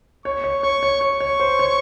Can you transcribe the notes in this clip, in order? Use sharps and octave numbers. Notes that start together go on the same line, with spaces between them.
C#5 C#6
C#5
C#5 C#6
C#5
C#5 C#6
C#5
C5
C#5